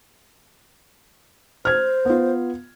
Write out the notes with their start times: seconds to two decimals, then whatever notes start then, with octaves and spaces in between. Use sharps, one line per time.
1.65 C5 F6 G#6
2.05 B3 F4